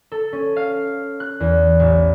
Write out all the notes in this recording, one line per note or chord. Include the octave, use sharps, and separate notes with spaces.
A4
C#4
F5
F#6
E2
A1